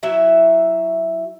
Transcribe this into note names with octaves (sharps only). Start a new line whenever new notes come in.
F#3 E4 E5